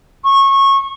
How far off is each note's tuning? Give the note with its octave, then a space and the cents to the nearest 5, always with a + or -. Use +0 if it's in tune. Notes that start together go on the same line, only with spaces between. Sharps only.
C#6 -20